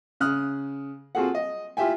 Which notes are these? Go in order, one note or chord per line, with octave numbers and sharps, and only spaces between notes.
C#3 D#6 F6 F#6
C4 F4 F#4 G#4 A4 F#5
D#5
E4 F4 G4 E5 G5 G#5